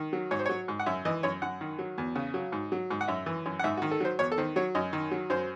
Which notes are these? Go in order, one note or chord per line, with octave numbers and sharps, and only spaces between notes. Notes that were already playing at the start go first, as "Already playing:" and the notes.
Already playing: D#3
F#3
G#2 C#5
C5
F#3 C#5
G#2
F#5
F#2 E5
E3 D#5
F#2 C#5
F#2 F#5
D#3
F#3
E2
C#3
F#3
G#2
F#3
G#2
F#5
F#2 E5
E3
F#2
F#5
G#2 E5
F#4
D#3
A4
F#3 C5
E2 C#5
A4
D#3 C5
F#3 C#5
F#2 D#5
D#3
F#3
F#2 C5